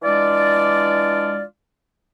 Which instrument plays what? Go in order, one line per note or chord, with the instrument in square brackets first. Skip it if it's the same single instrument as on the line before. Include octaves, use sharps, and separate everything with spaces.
[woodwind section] E3 G#3 D4 F4 D5